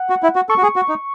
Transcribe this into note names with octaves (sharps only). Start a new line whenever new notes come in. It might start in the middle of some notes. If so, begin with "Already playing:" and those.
Already playing: F#5
F#4
E4
F#4
A4 C#6
F#4
G#4
F#4
D#4